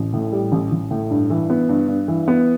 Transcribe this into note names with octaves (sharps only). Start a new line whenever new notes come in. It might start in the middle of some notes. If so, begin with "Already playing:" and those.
Already playing: A1
A2
G3
A1
A1
A2
G2
E3
B3
G2
G2
E3
B3